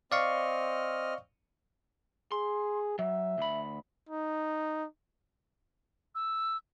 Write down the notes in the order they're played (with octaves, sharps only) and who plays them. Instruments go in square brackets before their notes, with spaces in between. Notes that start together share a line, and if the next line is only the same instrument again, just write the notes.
[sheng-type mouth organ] C4 D#5 F6 [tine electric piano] D5 F5 C#6
[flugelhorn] G#4 [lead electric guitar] C6
[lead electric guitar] F#3 [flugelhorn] E5
[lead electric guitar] D2 B5
[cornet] D#4
[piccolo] E6